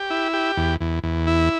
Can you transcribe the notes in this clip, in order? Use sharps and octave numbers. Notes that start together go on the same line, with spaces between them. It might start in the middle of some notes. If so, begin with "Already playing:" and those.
Already playing: G4
E4
G4
E2
E2
E2
E4